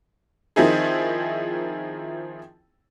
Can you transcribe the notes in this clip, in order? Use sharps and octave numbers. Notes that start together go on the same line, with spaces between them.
D#3 F3 C4 D#4 E4 G#4